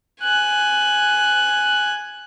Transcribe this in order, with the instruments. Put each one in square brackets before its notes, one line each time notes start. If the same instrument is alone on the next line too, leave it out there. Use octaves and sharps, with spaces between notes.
[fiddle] G#5 F#6